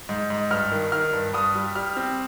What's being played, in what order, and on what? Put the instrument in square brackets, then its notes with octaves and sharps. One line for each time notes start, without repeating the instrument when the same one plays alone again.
[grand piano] G#2
G#2
G2 F6
D#3
D#3 F6
G2
G2 D#6
G3
G3 F6
C4